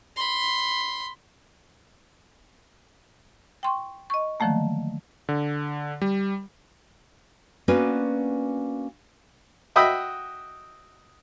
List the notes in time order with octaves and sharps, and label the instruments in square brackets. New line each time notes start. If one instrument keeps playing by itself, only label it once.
[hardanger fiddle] B5 C6
[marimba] G5 C6 C#6
D#5 C#6
D3 D#3 F3 F#3 A3 A#3
[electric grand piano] D3
G3
[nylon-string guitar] A#3 B3 C#4 D4 F#4 B4
[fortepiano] F#4 D#5 E5 G5 B5 D#6